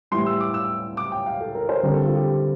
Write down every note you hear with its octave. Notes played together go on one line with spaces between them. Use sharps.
A2 E3 G3 C6
E6
D6
E6
D6
G5
F5
A4
A#4
C5
D3 G3 C4 A#4
A4
F4
G4